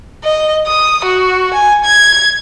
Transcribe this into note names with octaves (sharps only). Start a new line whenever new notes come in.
D#5
D#6
F#4
G#5
G#6